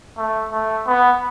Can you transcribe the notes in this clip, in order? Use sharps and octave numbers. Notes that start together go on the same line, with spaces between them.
A3
A3
B3